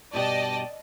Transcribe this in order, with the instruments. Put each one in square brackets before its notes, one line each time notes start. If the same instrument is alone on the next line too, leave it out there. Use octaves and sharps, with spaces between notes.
[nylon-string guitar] G2 B2 G4 [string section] D5 D#5 A5